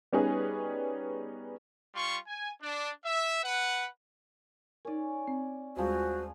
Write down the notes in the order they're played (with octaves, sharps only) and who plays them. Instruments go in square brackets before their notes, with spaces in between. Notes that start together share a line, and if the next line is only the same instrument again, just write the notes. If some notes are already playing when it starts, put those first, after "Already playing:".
[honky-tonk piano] G3 B3 C#4 D#4 G#4 B4
[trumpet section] G3 F4 C6 C#6
G#5
D4
E5
B4 F#5
[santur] C#4 D5 [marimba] D#4 A#4
[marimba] C4
[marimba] D#2 G3 G#3 [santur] F3 G#4 B4 [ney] F#4 [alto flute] C5